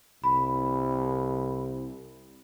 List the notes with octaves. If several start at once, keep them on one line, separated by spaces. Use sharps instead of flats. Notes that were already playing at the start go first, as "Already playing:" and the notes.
C2 B5